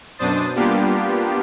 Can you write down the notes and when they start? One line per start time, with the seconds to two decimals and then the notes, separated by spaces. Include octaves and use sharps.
0.18 F#2 B2 D4 C5 D#6 A6
0.55 G3 A#3 B3 D4 F4 G4